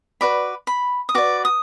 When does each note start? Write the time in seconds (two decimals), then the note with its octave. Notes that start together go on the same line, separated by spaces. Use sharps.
0.21 F#4 B4 D5 B5
0.67 B5
1.09 D#6
1.15 F#4 B4 D5 D6
1.45 D#6